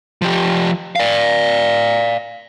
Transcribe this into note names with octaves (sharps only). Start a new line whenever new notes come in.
F3 G4
D5 F5